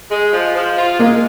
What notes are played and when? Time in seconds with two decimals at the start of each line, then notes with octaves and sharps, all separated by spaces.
0.10 G#3
0.33 F3
0.55 F3
0.77 F4
0.99 G#3 A#3